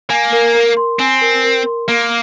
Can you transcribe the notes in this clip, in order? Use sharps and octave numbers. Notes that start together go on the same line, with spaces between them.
A#3 G#5
A#4
A#4
C6
C4 G#5
A#4
A#4
C6
A#3 A#4